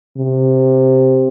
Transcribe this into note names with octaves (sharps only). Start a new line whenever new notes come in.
C3